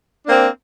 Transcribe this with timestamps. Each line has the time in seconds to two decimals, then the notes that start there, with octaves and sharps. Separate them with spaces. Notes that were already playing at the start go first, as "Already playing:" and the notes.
0.25 D4
0.28 A#3
0.31 C4